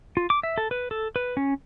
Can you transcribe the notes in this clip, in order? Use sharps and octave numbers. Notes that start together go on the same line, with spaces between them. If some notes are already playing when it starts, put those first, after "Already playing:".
F4
D6
E5
A4
B4
A4
B4
C#4